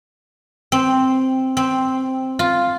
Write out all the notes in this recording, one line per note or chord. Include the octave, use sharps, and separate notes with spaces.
C4
C4
F4